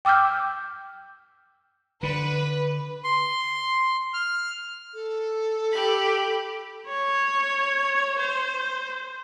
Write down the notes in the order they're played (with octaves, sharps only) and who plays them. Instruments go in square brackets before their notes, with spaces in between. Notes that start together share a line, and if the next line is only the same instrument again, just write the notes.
[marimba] G5 D6 E6 F6 G6
[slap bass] D3 [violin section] B4
[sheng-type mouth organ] C6
F6
[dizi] A4
[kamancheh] G4 B5
[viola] C#5
C5